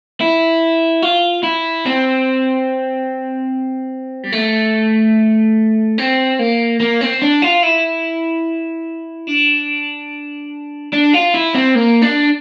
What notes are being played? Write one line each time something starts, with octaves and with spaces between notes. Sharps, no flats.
E4
F4
E4
C4
G3
A3
C4
A#3
A#3
C4
D4
F4
E4
D4
D4
F4
E4
C4
A#3
D4